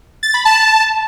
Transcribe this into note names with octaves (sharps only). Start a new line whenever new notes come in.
A6
B5
A5